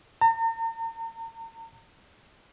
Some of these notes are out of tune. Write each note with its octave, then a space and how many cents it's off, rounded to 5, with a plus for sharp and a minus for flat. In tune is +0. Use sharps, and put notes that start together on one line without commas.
A#5 -45